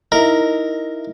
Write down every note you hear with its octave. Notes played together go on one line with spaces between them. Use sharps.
D#4 E4 A#4 D#5 E5